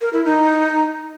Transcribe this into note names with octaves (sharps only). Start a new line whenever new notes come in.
A#4
E4
D#4